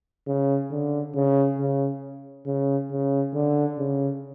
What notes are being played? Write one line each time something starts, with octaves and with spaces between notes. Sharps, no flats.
C#3
D3
C#3
C#3
C#3
C#3
D3
C#3